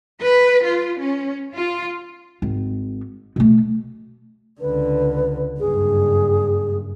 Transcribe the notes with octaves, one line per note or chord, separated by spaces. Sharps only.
B4
F4
C#4
F4
G#1
B2 A3
C#2 D3 B4
F#1 G2 G#4